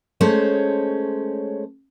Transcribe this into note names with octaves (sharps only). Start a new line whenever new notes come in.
G#3 A3 C#4 C5 C#5